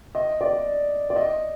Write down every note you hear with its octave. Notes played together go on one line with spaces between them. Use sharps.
D#5
D5
D5
D#5